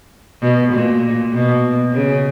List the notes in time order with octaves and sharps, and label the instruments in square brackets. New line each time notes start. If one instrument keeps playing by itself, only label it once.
[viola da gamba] B2
A#2
B2
C#3